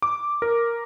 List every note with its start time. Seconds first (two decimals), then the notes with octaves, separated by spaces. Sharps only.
0.02 D6
0.42 A#4